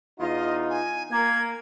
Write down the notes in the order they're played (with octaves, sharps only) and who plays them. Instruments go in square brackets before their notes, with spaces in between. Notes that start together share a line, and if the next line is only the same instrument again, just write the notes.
[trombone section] E2 D#4 F4 [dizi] D#5
[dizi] G#5
[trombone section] A#3 [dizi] G#6